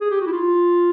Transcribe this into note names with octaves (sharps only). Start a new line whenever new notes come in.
G#4
G4
F#4
E4
F4